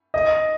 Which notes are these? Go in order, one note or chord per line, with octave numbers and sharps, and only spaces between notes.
D#5